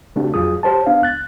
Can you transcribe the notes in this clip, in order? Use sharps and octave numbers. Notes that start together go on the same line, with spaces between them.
C#3 A3 C4 D4 F#4 G4
F2 F#3 F4 G#4 D#6
G4 C5 C#5 A5
B3 D4 F5
C#2 F#6 A6